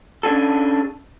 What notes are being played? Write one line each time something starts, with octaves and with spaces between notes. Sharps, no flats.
C#4 D4 G#4 A4